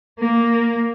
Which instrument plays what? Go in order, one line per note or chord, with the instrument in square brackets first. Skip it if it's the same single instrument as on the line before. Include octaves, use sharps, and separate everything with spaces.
[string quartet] A#3